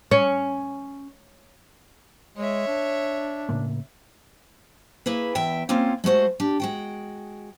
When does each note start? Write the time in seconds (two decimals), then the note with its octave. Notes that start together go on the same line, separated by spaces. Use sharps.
0.11 C#4
2.37 G#3 C#5 E5
2.67 D4
3.49 A2 C#3 A#3
5.06 A#3 E4 G#4 B4
5.35 E2 E5 G5
5.69 A#3 C4 C#4 F4
6.04 G#3 A3 F#4 C5
6.40 D4 G4
6.60 G#3 F#4 G5